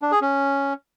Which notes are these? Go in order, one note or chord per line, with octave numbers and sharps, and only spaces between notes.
D4
G#4
C#4